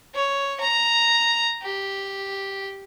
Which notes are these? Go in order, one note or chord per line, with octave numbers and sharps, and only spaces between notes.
C#5
A#5
G4